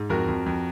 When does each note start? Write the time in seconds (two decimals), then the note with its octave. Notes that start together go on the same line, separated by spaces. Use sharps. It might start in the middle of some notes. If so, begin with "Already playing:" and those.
Already playing: G#2
0.10 F2 F#4 A#4
0.28 F2
0.46 F2